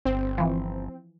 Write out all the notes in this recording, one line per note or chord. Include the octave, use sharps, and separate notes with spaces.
G1 C4
E3 F3